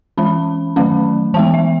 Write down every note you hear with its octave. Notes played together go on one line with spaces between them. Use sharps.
E3 G#3 C#4 B5
D#3 F#3 A3 C#4
E3 G#3 B3 A5
E5